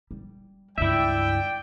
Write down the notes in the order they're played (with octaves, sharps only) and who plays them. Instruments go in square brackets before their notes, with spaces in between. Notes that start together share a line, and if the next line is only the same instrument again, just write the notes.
[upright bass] G3
[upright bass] C#2 G2 [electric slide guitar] E4 E5 [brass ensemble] D5 G5